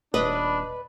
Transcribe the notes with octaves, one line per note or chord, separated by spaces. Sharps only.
D#1 D4 B4 D#5